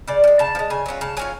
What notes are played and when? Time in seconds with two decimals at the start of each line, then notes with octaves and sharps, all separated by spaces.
0.07 C#3 D5
0.24 F3
0.27 G#3
0.39 C#3 A5
0.55 F3
0.59 G#3
0.70 C#3 G#5
0.86 F#3 C#4 F4
1.01 C#3 A5
1.17 F#3 C#4 F4 G#5